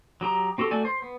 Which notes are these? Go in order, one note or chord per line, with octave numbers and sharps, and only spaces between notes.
F#3 G4 A#5 D#6
C4 F#4 G4 A4
A3 F#4 A4 D5 G#5
C5
B3